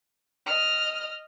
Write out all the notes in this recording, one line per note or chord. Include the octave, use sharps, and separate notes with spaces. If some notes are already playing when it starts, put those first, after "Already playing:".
D#5 F6